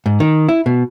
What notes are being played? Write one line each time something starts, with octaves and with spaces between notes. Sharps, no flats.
G#2
D#3
E4
B2